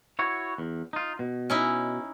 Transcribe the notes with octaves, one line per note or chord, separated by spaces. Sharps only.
E4 F#4 C#5
E2
D#4 F4
B2
C#4 D#4 E4